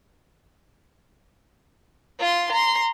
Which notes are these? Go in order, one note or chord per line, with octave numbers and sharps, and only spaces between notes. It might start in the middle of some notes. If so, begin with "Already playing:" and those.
F4 C6
A#5 C6